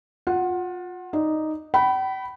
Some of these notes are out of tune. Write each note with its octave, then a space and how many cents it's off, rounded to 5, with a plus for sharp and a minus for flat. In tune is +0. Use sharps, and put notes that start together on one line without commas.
F4 +25 F#5 +0
D#4 +0 D5 +5
G5 -45 B5 +0